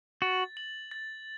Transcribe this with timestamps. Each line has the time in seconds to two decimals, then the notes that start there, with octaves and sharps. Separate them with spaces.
0.22 F#4 A6
0.57 F#7
0.91 A6